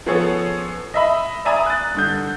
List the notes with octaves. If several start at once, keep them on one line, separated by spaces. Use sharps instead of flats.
F3 B3 C#4 G#4 A4 C#5
D#5 E5 B5
D5 E5 G#5 A#5 B5 D#6
F#6 A6
G2 D3 G6